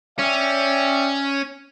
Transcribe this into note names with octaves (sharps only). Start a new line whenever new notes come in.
C#4 D5 E5 G5